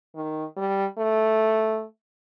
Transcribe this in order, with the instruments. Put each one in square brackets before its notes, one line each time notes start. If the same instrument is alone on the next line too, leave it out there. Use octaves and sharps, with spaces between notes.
[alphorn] D#3
G3
A3